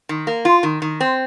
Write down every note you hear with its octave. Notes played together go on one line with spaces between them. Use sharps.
D#3
A#3
F4
D#3
D#3
C4